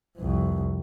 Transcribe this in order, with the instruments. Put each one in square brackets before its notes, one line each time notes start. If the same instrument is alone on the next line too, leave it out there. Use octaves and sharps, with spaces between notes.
[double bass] C2 F2